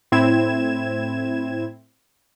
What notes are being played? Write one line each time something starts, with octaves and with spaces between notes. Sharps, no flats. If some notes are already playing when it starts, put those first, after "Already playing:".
A2 C4 E4 G#6 E7